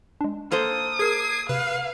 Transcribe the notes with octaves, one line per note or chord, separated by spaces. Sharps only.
G#3 D4
A#3 A4 C5 D#6
G#4 A#4 G#6 C7
C3 B4 F5